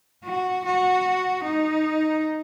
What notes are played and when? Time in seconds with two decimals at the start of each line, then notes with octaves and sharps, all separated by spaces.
0.24 F#4
0.65 F#4
1.44 D#4